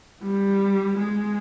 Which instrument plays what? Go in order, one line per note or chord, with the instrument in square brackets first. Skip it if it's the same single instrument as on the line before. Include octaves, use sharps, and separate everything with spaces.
[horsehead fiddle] G3
G#3